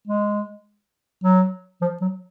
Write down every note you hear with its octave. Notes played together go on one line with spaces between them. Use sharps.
G#3
F#3
F3
F#3